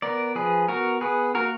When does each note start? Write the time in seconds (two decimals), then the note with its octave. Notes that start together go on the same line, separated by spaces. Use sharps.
0.02 B3 A#4 D5
0.35 F3 G#4 B4
0.68 B3 F#4 A#4
1.01 B3 G#4 B4
1.34 A#3 F#4 A#4